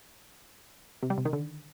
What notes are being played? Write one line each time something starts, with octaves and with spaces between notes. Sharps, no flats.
C3
G3
C3
D#3
D3